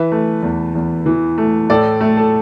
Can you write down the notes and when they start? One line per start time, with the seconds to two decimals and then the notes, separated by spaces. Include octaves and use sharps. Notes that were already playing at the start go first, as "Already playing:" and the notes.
Already playing: E3 B4 E5
0.12 A3
0.43 E2
0.75 E2
1.06 E3
1.38 A3
1.70 A2 A4 D5
2.01 A3
2.17 A4